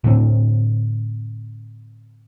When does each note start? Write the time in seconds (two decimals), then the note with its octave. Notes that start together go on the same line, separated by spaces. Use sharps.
0.04 A2 D3 C4